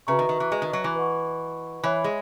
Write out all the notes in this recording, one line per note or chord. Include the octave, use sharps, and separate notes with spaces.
C#3 F#4 B4 E5 A#5 C#6
D#3
D#3
E3
G#3
D#3
F#3
E3
B4 D#5 F#5 C#6
E3 C#5 E5 B5
G#3